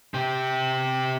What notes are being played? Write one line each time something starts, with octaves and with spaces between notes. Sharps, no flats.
C3 G4